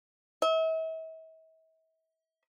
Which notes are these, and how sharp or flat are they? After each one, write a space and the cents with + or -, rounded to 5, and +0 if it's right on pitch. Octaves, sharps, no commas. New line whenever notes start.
E5 -40